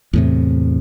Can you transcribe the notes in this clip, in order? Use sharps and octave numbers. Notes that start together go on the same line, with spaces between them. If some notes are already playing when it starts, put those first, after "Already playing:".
E2 A2 C3